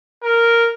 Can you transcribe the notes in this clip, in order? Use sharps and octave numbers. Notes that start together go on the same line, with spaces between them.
A#4